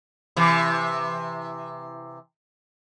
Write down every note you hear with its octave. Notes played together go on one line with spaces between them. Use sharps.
C3 E3